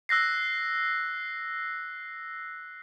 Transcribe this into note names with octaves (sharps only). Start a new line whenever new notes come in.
E6 F#6 A#6 C7